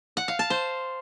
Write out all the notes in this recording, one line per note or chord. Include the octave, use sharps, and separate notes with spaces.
F#5
F5
A5
C5